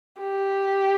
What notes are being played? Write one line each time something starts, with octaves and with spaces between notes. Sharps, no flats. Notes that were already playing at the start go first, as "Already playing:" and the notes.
G4